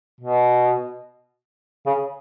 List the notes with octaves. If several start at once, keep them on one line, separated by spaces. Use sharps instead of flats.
B2
C#3